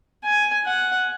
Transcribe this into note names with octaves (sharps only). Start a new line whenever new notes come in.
G#5
F#5